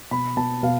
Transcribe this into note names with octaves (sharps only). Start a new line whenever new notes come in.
B2 B5
B2 A5
B2 F5